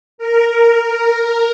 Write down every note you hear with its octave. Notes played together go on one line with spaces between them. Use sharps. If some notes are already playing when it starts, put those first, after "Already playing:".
A#4